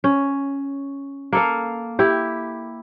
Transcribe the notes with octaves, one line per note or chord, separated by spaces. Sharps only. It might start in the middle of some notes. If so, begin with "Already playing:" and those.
C#4
A#3 A4 F5
E4 G4